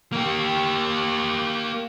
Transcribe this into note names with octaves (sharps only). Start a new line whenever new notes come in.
A#3 G4